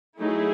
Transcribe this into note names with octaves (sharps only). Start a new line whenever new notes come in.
F#3 A3 D#4 E4 G#4